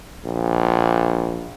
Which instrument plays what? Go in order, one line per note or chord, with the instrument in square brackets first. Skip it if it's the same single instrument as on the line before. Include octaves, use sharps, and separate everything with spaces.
[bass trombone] A#1